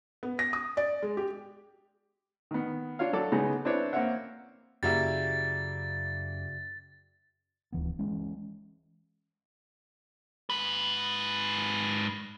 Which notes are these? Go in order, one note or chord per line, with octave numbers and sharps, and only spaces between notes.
B3
A#6
D#6
D5
G#3
G4
D#3 B3
D4 F4 C#5 F5
F#3 A4 D5
C#3 G#3 B3 D#4
C4 D4 E4 B4 C#5 D5
A#3 C4 C#4 C#5 E5 F#5
F#2 C#3 G3 A#3 E4 F#4 D5 A6
D1 E3 B3
E3 G#3 C#4
G#2 B4